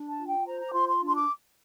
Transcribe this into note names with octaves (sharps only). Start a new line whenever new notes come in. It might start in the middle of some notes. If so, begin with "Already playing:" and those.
Already playing: D4
A5
F4
G5
C5 A#5
A#5
D6
F4 C6
C6
D4
C6
D6